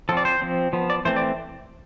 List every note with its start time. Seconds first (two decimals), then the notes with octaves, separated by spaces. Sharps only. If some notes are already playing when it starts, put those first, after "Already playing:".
0.09 F3 A4
0.12 C4 D5
0.25 C5
0.42 F3 C4
0.73 F3 B3
0.90 D5
1.05 E3 A3 C4 C5
1.16 D5